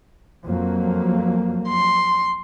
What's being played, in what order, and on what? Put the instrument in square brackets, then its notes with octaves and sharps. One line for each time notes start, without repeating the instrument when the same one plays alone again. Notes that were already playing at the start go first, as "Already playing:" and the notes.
[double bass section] F2 F#3 A#3
[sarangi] C6